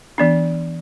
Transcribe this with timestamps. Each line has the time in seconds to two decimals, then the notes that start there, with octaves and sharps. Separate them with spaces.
0.18 E3 B3 D4